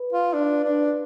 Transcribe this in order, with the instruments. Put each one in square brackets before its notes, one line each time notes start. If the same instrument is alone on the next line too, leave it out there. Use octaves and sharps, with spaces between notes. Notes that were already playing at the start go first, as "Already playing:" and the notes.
Already playing: [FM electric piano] B4
[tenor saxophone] F4
D4
D4